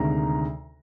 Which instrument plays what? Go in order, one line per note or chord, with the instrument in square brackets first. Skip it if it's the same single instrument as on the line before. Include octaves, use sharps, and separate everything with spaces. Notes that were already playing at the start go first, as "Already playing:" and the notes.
Already playing: [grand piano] D2 C3 D#3 G#3 A#5